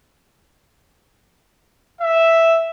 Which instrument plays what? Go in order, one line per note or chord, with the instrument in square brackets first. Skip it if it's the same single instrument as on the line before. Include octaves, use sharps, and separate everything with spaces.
[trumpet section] E5